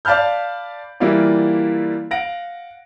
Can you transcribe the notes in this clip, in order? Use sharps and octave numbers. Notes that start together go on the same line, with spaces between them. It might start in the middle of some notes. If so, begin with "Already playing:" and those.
D5 F5 A5 B5 F6 G6
E3 G3 A#3 E4 F4 D5
F5 F#5 A#6 D7